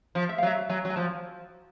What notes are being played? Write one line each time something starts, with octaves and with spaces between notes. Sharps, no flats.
F3
E5
F5
F#3
E5
F#3 G#5
F#3
G#5
F3 A5